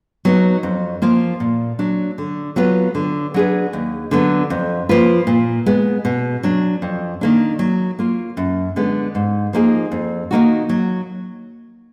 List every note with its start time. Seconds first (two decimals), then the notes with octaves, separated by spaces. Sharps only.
0.25 F#3 B3 D#4
0.63 F2
1.02 F3 A#3 F4
1.40 A#2
1.79 F#3 D4
2.18 D3
2.56 F#3 B3 F4 B4
2.95 D3
3.34 F#3 D4 G#4 B4
3.73 D#2
4.11 D3 F#3 B3
4.50 F2
4.89 F3 A#3 F4 B4
5.27 A#2
5.66 G#3 B3
6.05 B2
6.43 F#3 D4
6.82 F2
7.21 D#3 A#3 D4
7.59 F#3
7.99 A#3 F4
8.37 F#2
8.76 D3 G#3 B3
9.15 G#2
9.53 F3 A#3 D#4 G#4
9.92 F2
10.31 D#3 A#3 D#4 F#4
10.69 F#3